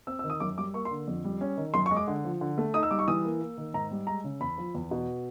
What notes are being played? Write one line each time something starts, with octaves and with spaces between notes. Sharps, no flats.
C4 E6
E6
D#3
D#6
F#2 D6
G3 D6
A#3 C#6
C6
D3
F2
G3
C#4
D#3
F#2 C6
C#6
G#3
D6
D3
F3
D3
A3
D#4 D#6
E6
G3 D6
C#6
E3 D#6
A#3
A#3
D#3
G#2 A#5
G3
G#3 A#5
C#3
E2 B5
F3
E2
B2